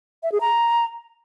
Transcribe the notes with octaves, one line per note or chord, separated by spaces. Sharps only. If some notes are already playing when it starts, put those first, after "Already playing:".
E5
G#4
A#5